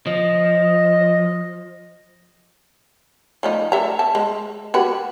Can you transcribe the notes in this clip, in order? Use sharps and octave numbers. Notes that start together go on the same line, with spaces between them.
F3 D#5
F3 A3 D#4
A4 E5 A#5
E5 A5
G#3
F#4 G4 B4